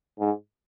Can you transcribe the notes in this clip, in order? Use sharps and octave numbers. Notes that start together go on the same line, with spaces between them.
G#2